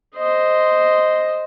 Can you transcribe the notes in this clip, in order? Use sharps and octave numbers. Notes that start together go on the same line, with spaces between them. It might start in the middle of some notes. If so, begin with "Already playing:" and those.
C5 D#5